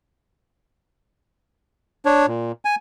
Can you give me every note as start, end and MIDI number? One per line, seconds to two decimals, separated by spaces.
2.05 2.26 62
2.05 2.26 73
2.27 2.52 46
2.65 2.75 80